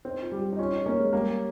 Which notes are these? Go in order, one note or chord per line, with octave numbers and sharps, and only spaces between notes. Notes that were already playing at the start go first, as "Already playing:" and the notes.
C4 D#4
F4
G3
G4
D#4
C#4 F4
D#4
A#3 C#4
G#3
G3 A#3